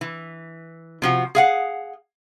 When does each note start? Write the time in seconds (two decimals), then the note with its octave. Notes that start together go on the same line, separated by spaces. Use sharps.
0.01 E3
1.02 C3 F3 F#4
1.35 G#4 F5 F#5